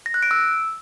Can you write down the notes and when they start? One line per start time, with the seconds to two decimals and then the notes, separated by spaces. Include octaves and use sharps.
0.06 A#6
0.14 F#6
0.23 D7
0.31 E6